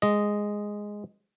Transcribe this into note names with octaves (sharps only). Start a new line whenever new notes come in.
G#3 D#5